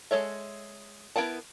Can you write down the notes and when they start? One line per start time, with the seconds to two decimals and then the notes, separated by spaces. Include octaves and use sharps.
0.11 G#3 A4 C#5 E5
1.16 B3 E4 A#4 F#5 A5